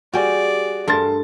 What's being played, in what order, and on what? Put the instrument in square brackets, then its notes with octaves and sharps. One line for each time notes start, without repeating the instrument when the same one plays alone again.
[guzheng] G3 G5 [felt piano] F#4 G#5 [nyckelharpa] G#4 D5
[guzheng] G2 A3 A#4 [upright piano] A5 C6 A6